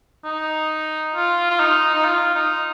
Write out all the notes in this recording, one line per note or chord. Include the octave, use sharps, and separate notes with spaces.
D#4
F4
F4
D#4
D#4
F4
D#4